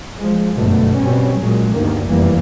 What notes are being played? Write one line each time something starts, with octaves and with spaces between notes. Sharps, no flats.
F3 G#3
G1 F#2 B2 D3 A3
B2 G3 C4 C#4
A#2 F#3 G#3
D2 G2 D#3 A#3
F1 F#2 E3 G3 A#3